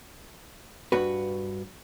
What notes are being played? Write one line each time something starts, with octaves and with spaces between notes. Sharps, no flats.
G2 F#4 B4